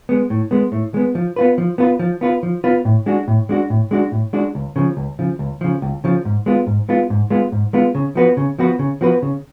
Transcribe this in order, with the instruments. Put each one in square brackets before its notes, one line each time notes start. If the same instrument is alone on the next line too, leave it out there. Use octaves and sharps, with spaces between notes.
[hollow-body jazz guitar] G#3 B3
A2
G#3 B3
A2
G#3 B3
F3
B3 F4 B4
F3
B3 F4 B4
F3
B3 F4 B4
F3
B3 F4 B4
A2
G#3 D4 F#4
A2
G#3 D4 F#4
A2
G#3 D4 F#4
A2
G#3 D4 F#4
C#2
C#3 F3
C#2
C#3 F3
C#2
C#3 F3
C#2
C#3 F3
G#2
G#3 B3 F4
G#2
G#3 B3 F4
G#2
G#3 B3 F4
G#2
G#3 B3 F4
C#3
F3 B3 F#4 B4
C#3
F3 B3 F#4 B4
C#3
F3 B3 F#4 B4
C#3